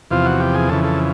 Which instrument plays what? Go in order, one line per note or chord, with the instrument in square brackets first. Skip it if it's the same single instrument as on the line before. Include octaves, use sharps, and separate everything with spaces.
[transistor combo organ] E2 C3 F3 F4
F#4
G4
G#4
F2 C#3 E3 A4
A4